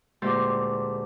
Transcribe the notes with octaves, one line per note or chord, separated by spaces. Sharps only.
D2 A#2 G#3 G4 C6